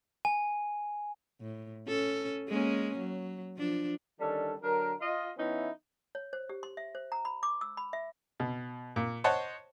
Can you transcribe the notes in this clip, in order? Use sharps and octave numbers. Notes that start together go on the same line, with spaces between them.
G#5
A2
C#4 A4
G#3 A#3 C#4
F#3
F3 D4
D3 D#3 G3 C#4 D4 A4
D3 F#3 D4 A#4
F4 D#5
E3 B3 C#4 D#4 E4
C#5
C5
G4
C6
E5
C5
A#5
B5
D6
E6
B5
E5
B2
A#2
C5 C#5 D#5 F#5 A5